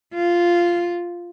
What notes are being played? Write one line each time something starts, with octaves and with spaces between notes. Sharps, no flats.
F4